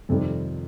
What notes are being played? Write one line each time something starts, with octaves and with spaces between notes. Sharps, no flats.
F2 C3 D#3 G3 A4